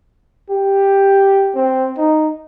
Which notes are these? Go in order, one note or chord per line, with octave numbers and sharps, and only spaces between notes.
G4
C4
D#4